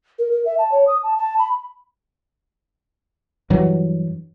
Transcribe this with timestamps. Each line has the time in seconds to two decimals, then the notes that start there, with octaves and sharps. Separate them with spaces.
0.19 A#4
0.32 A#4
0.45 E5
0.58 A5
0.72 C#5
0.87 D#6
1.03 A5
1.18 A5
1.39 B5
3.50 G2 E3 F#3